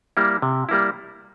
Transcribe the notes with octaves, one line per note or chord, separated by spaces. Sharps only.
G3 A#3 E4
C3
G3 A#3 E4